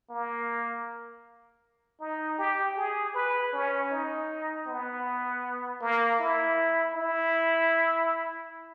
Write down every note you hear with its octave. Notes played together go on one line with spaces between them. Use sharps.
A#3
D#4
G4
G#4
B4
C#4
D#4
B3
A#3
E4
E4